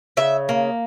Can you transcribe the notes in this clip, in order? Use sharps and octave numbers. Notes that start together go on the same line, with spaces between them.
C#3 E5
A#3